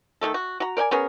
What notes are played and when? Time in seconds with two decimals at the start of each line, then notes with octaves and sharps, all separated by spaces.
0.21 D#3 G#3 A3 A4
0.34 F#4
0.60 F#4 A#5
0.77 A#4 D5 G5 G#5
0.91 B3 C#4 G#4 A#4